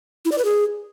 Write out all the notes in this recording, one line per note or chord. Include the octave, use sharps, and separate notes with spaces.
E4
D5
B4
G#4